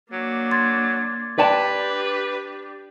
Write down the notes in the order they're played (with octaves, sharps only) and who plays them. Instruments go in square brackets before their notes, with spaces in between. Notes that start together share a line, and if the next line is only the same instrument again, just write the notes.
[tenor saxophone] F#3 [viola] A#3 D4
[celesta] C6 G#6 A6
[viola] D4 G4 [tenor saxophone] B4 [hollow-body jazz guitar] D5 G5 A5